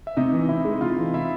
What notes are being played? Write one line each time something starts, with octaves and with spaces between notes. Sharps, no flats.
E5
C3 D#4 D#5
E3
C3 E4 E5
G#3
C3 F4 F5
E3
C3 E4 E5